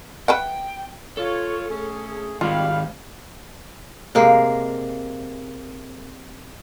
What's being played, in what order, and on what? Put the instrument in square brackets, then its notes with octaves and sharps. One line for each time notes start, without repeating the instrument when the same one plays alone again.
[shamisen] B4 E5 F#5 [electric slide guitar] G5
[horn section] F4 C#5 [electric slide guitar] A4
[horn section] A3 C#4 G#4
[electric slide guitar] D#3 G#3 [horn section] G3 F5 [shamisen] F4
[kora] C3 G#3 A#3